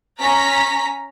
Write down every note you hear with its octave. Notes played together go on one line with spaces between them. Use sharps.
C#4 A#5 B6